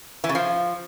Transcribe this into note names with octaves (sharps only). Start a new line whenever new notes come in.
E3
C#3
F3